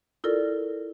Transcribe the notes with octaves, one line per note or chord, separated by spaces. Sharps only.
E4 F4 A4 A#4 D5